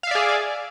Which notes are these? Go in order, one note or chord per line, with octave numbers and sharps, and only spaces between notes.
G#4 D5 E5 F5